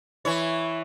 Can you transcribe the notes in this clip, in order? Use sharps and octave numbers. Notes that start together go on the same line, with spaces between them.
E3 E4 C#5